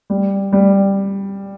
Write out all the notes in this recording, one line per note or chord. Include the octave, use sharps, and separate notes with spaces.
G3
G3